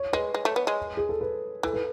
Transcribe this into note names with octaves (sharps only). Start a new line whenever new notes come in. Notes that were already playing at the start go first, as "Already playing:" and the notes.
Already playing: C#5
G#3 B4
G#3
A3
B3
G#3
G#4
A4
B4
E3 A4
B4